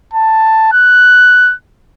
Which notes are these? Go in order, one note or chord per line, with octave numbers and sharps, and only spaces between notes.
A5
F#6